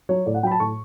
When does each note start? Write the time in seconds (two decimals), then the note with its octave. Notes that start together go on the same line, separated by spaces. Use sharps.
0.09 F#3 C#5
0.26 A2 D5
0.34 F#5
0.43 F#3 G5 B5
0.52 A5
0.60 A2 C#6